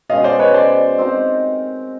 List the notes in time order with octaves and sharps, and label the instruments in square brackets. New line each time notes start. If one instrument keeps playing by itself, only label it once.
[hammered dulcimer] B2 G#3 C#4 F#4 [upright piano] D#5 F5
[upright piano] C5 D5
B4 C#5
C5 D5
[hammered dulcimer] C4 D#4 G4 A#4